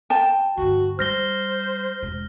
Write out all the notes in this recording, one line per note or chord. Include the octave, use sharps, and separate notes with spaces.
G5 A5
G2 D3 F#4
G3 C5 F6 A#6 G7
E1 B2